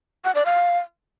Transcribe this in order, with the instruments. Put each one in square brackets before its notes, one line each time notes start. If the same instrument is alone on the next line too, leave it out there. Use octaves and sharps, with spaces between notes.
[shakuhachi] F#5
D5
F5